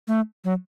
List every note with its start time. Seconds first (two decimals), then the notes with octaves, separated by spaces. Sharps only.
0.08 A3
0.44 F#3